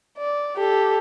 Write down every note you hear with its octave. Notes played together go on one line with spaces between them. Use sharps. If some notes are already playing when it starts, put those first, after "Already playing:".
D5
G4 A4